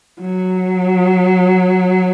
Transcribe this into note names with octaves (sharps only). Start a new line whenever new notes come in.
F#3